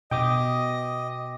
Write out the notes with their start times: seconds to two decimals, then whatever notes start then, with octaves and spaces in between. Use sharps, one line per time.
0.11 B2 D#5 G5 D6 D#6